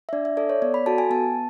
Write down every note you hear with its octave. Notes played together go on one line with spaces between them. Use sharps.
E5
D4 D5
E5
A4 D5
C#5
B3 D5
B5
F#4 A4 A5
G#5
B3 A5